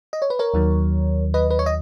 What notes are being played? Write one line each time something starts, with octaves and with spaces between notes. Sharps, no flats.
D#5
C#5
B4
A#4 C#5
D#2 D#3 F#3
B4 D#5
B4
C#5
D#5